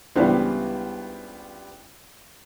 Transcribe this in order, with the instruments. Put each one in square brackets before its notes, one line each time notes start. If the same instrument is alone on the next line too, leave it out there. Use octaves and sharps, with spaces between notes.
[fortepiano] C#2 E3 D4 [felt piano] G3 B3 C5